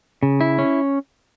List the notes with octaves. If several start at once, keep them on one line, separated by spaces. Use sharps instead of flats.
C#3
E4
C#4